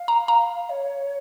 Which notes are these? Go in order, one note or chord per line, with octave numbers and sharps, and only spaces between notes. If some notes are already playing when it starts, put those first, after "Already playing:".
Already playing: F5
A#5
A#5
C#5